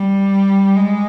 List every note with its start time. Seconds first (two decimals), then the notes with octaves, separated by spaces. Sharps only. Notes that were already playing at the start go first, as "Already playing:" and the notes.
Already playing: G3
0.77 G#3